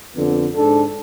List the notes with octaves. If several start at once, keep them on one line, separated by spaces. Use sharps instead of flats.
F2 D3 B3
G#2 D4 A4